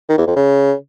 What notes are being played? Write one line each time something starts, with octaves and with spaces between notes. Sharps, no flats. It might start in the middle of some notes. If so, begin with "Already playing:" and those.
D#3
E2
F2
C#3